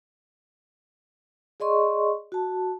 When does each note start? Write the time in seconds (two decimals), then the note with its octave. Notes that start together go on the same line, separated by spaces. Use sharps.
1.60 G#4 D5 D#5 C6 C#6
2.32 F#4 A5